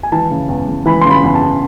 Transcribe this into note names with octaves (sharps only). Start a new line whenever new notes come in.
G#5
E3 A5
C#3
E2
E2
E3 B5
C#3 C6
B5
E2
A5
E2